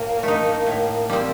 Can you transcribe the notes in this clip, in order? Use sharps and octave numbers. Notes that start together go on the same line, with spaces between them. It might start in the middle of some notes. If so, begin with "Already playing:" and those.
Already playing: A2 A#3
A3 D#4
A2
G3 C4